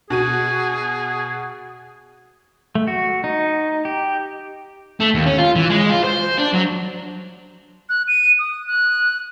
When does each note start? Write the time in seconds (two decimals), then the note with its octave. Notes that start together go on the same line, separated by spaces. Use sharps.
0.10 B2 F#4 G#4 D#7
2.75 A3
2.88 F#4
3.24 D#4
3.85 G4
5.00 A3
5.14 D#2
5.26 C#4
5.38 F4
5.56 E3
5.70 G#3
5.90 F4
6.04 C5
6.38 D4
6.54 F#3
7.89 F#6
8.08 D#7
8.39 D#6
8.67 F#6